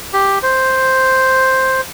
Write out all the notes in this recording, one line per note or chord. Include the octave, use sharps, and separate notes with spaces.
G4
C5